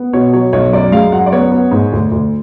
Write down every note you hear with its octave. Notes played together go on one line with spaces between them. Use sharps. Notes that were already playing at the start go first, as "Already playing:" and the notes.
Already playing: B3
B2 C#5
F#3 C#5
B1 C#5
F#2 D5
G#3 F5
F#2 F#5
D5
B3 C#5
B3
G#2
D2
D2